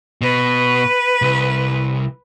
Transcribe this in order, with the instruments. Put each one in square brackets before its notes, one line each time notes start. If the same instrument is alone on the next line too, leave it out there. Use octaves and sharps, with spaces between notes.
[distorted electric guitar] B2 [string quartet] B4
[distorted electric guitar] C2